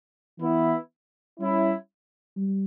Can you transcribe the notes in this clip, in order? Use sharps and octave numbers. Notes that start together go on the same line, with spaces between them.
E3 B3 E4
G3 C#4 E4
G3